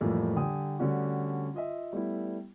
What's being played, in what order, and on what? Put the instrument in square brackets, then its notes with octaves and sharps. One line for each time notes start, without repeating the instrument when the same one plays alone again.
[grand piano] F2 A2 E3 G3 A3 A#3
D3 G3 G5 G#5 D#6
D3 G3 A3 C#4 D4 F#4
F4 D#5 E5
G3 A3 B3 E4